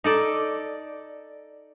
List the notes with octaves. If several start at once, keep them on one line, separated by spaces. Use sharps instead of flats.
D#4 A4 D5